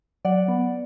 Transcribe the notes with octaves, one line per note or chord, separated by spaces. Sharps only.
F#3 D5 F#5
B3